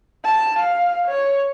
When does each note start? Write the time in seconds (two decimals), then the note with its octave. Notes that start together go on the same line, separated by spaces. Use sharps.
0.24 A5
0.59 F5
1.07 C#5